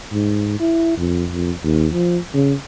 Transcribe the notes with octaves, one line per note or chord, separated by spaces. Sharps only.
G#2
E4
F2
F2
D#2
F3
C#3